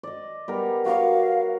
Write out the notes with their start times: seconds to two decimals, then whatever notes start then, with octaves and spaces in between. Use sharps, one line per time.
0.03 D5 D#5
0.48 G3 B3 A#4
0.86 F#4 A#4 C#5 F5